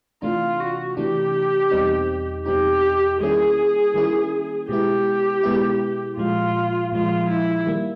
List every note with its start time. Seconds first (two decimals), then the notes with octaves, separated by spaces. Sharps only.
0.22 C3 E3 A3 D4 F4
0.60 F#4
0.97 C3 E3 A3 D4 G4
1.71 E2 B2 G3 C4 D#4
2.46 E2 B2 G3 C4 D#4 G4
3.20 D#3 G3 A#3 C#4 E4 G#4
3.94 D#3 G3 A#3 C#4 E4
4.69 B2 G#3 B3 E4 G4
5.43 B2 G#3 B3 E4
6.17 A#2 F3 G#3 F4
6.92 A#2 F3 G#3 F4
7.30 E4
7.66 D#3 G3 A#3